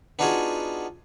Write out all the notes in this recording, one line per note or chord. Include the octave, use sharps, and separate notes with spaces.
B3 D4 D#4 F4 F#4 G#4